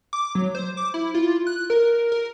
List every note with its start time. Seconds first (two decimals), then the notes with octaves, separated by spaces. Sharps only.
0.13 D6
0.35 F#3
0.55 C5
0.77 D6
0.94 E4
1.14 F4
1.47 F#6
1.70 A#4
2.12 A#4